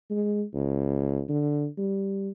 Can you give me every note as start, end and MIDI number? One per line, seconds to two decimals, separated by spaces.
0.10 0.44 56
0.54 1.22 37
1.29 1.68 50
1.78 2.30 55